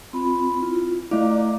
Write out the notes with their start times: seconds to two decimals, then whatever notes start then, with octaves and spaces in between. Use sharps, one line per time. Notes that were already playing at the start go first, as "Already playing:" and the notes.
0.13 C4 F4 B5
0.61 E4 F4
1.11 A3 E4 D5 F5 D6